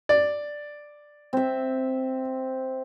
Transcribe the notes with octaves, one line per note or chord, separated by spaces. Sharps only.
D5
C4 E5